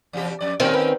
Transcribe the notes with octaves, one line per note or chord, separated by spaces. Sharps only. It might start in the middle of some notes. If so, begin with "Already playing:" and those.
E2 C3 G4
F2 D5
A2 D#3 G3 C4 C#4 A#4
A#3 B4